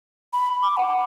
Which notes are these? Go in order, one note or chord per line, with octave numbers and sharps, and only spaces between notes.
B5
D6
F#5